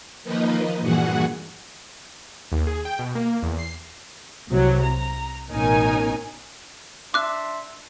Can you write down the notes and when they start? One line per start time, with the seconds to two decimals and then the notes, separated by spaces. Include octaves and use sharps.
0.23 D#3 F3 A#3 D#4 B4 D#5
0.81 G2 A#2 E3 F#4 G#4 F#5
2.52 D#2
2.67 G#4
2.85 G5
2.99 B2
3.15 A#3
3.43 E2
3.59 C7
4.48 C2 C3 F#3
4.82 A#5
5.50 A1 B2 C#4 D#4 A#4 G#5
7.14 D4 E5 C6 D6 F#6